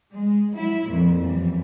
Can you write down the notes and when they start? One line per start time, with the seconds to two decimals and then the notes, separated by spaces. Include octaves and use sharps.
0.15 G#3
0.53 F#3 E4
0.87 F2 A#2
1.20 F#2 E3 G3